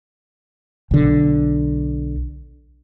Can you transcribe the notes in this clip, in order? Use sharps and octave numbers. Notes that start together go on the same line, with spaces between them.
B1 D3